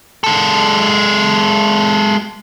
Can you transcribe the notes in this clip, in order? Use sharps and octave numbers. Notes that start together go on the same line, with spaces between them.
G#3 A4